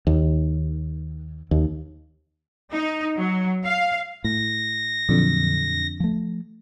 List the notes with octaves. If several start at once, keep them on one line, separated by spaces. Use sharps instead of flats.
D#2
D#2
D#4
F#3
F5
A2 A#6
F2 A#2 D3 F#3
F3 A3